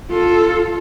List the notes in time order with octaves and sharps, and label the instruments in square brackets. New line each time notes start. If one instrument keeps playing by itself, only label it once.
[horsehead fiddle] F4 A4